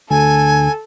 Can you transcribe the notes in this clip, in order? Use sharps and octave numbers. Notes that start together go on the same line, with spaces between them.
D2 A4 G#5